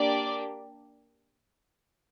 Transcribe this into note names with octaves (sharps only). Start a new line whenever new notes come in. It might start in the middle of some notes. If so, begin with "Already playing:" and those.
Already playing: A#3 D4 G4 D5